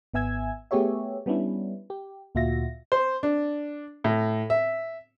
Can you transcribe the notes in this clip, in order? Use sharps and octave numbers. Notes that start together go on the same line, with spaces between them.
G#1 B3 E5 G#5 E6 G#6
A3 B3 G4 G#4 C#5 E5
G3 B3 C#4 D4 E4
G4
D2 A#2 F4 F#4 E5 A#6
C5
D4
A2
E5